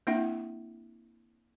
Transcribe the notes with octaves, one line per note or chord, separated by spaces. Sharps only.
A#3 C4 D4 E4 E5 F#5